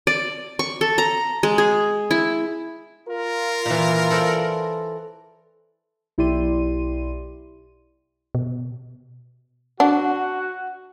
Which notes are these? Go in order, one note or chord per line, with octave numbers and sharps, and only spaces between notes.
D5
C#6
A4
A#5
G#3
G#4
E4
F4 A#4
A#2 E3
A4 C5 D5
B1 E4 G4 D5 C6 D#7
B2
D4 F#4 F#5